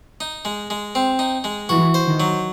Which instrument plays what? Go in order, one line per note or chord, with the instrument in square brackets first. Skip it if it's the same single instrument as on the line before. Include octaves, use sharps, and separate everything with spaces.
[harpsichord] D#4
G#3
G#3
C4
D#4
G#3
[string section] E3 [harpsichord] F#4
[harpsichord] C5
[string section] D#3
[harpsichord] F#3